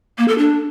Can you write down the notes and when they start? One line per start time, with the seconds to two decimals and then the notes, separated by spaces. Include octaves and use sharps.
0.18 A#3
0.28 A4
0.38 D4